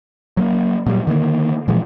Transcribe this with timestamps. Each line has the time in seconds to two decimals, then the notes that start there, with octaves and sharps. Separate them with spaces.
0.37 F#3 G#3 A#3
0.86 A#2 F#3 G3
1.07 D3 D#3 A3 A#3
1.68 A#2 E3 F3 G#3